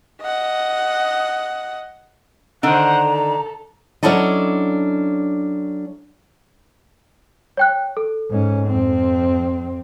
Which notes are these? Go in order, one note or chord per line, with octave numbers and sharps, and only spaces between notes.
D#5 F#5
D3 D#3 C5 D5 F#5 A#5
A4
F#3 C#4 D4 E4 A4 D#5
C#5 G5 F#6
A4
G#2 C#4
F2 C4